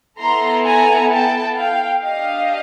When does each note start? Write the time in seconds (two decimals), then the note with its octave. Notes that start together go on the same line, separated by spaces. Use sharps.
0.19 B3 E4 A4 A#5 C6
0.65 G#5 A#5
1.11 G5 A5
1.57 F5 G5
2.02 D4 G4 D#5 F5